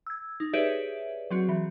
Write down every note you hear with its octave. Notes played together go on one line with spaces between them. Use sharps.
E6 G#6
D#4
G4 G#4 B4 C#5 D5 E5
F#3 C4 F#4
E3